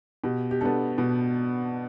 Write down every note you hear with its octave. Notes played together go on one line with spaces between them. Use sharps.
B2 G4
G4
B3 D4 A4
B2